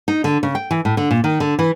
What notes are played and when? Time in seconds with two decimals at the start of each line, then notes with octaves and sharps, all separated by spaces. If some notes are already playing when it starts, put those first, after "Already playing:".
0.08 D#4
0.24 D3
0.43 C#3
0.55 G5
0.71 E3
0.85 A2
0.97 D3
1.11 A#2
1.24 D#3
1.40 D3
1.59 E3